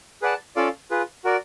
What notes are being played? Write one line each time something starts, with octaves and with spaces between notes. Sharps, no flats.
G#4 B4 D5 F#5 A5
C#4 F4 A4 D5 F5
F4 G#4 B4
F#4 A#4 D5